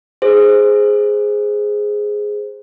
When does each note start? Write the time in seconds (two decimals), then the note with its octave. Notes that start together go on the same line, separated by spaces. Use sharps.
0.22 G#4 C5